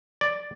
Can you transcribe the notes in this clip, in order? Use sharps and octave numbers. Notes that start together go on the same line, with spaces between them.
D5